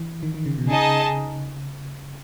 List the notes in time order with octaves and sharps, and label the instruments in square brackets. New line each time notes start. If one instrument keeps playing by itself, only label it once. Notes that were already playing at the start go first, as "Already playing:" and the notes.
Already playing: [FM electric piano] E3
D#3
D#3
C#3
B2
[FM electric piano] C#3 [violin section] D#4 G#4 D#5 A5